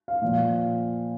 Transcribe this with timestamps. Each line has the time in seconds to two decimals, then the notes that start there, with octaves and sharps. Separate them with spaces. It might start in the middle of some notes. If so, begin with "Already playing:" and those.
0.08 F5
0.22 A#2 F3